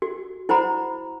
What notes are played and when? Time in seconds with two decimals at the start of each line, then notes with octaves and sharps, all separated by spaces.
0.02 F#4
0.49 E4 C5 F#5 A#5 B5